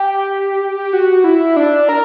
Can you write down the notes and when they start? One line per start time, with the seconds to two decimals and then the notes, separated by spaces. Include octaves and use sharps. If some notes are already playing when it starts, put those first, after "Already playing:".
Already playing: G4
0.93 F#4
1.24 E4
1.56 D4
1.89 A#4